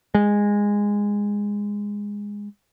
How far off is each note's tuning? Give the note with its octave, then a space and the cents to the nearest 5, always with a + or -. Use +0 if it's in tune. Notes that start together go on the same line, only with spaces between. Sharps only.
G#3 -15